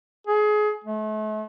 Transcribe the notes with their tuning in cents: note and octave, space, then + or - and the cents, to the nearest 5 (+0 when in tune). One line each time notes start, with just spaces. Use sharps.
G#4 +25
A3 -40